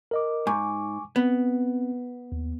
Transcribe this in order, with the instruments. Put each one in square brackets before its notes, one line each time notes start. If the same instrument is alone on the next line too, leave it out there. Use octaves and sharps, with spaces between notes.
[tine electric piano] A#4 D#5 D6
[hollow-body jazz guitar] G#2 [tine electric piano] G#5 C#6 D6
[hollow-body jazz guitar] B3 [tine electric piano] C4
[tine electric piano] D#2